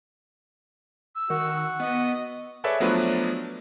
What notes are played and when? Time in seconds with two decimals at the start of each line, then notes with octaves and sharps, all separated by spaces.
1.16 E6
1.30 D#3 F#4
1.80 B3 D#5
2.64 G#4 A4 B4 C#5 D5 E5
2.80 F3 F#3 A3 B3 D4 B4